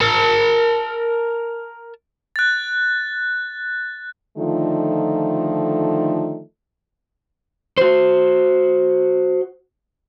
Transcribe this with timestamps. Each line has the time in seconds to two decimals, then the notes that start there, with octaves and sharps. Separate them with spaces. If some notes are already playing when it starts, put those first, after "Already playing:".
0.01 A#4 A5
2.36 F#6 A6
4.37 D3 D#3 F3 A3 D#4 F4
7.78 F#4 C5